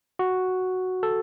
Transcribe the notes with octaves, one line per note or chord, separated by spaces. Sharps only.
F#4
A4